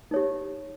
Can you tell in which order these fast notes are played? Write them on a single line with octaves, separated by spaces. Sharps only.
D#4 C#5 G4